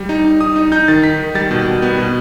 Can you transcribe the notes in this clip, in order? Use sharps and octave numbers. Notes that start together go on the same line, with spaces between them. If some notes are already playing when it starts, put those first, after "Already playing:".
Already playing: G3
D#4
D#4
D#4 D#6
D#4
D#4 G6
D#3 A6
D#4 B6
D#3
G3 A6
B2
B2
B3
B2